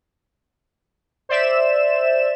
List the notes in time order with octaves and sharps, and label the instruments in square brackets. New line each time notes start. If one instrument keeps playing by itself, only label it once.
[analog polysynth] C5 D5 E5 E7